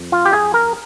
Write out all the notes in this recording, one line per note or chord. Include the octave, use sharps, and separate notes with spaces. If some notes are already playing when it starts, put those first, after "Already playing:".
Already playing: F2
F4
G4
G#4
A#4